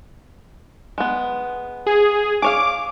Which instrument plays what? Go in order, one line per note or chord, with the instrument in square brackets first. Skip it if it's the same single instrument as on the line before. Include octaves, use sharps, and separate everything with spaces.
[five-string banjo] G#3 B3
[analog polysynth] G#4
[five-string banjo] G#4 C#5 F5 [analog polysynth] D6